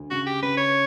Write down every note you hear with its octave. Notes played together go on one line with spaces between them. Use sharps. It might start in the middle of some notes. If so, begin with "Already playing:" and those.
Already playing: D2
C#3 F#4
G4
C#3 B4
C#5